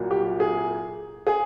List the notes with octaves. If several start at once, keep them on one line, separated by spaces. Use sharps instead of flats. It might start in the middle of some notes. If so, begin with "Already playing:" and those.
Already playing: C2 A#2 F#3
G4
G#4
G#4